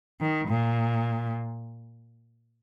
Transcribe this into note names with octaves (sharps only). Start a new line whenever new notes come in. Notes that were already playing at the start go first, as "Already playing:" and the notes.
D#3
A#2